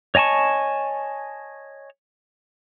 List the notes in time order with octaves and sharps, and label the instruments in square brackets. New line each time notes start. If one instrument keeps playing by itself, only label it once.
[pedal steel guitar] C#5 D#5 G#5 A5 C#6